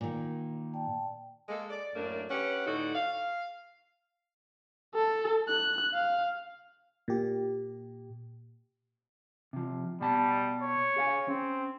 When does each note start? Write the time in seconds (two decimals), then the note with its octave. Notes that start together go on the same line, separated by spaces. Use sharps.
0.01 A#2 D#3
0.73 D5 G5 A5
1.49 G#3 A#3 A4
1.70 D5
1.95 F#2 A2 A3 A#3 D4 A#4
2.30 C#4 G4 B4 F#5
2.66 A2 D3 D#4 F#4
2.94 F5
4.95 A4
5.48 F#6
5.94 F5
7.08 A#2 G4
9.53 C3 F3
10.01 B2 G3 A5
10.62 C#5
10.96 G#4 F5 G#5
11.28 C4 C#4